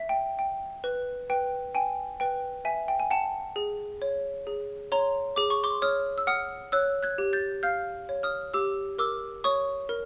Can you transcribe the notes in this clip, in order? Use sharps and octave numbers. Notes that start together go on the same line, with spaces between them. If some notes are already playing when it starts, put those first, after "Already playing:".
Already playing: E5
G5
G5
B4
B4 G5
G5 G#5
B4 G5
E5 G#5
G5
G#5
F#5 G5 A5
G#4
C#5
G#4
C#5 A#5 C6
G#4 D6
C#6
C6 D6
C#5 D#6 F6
E6
F#5 D#6 F6
C#5 E6 F#6
F#6 G#6
G4
G6 A6
F5 F6 G6
C#5
D#6 F6
G4 D6 E6
A#4 D6 E6
C#5 C#6 D#6
A#4